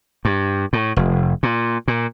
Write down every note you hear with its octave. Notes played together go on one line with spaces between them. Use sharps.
G2
A2
F1
A#2
A#2